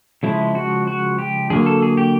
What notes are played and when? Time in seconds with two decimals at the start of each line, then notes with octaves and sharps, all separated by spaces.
0.23 C#3 F3 G#3 E4
0.55 F#4
0.87 F#4
1.18 G4
1.50 D3 F#3 A#3 G#4
1.66 A4
1.83 G#4
1.97 G4